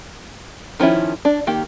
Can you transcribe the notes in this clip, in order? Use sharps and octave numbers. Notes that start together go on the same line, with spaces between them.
D#3 F3 C#4 E4
D4
D#3 A#3 G4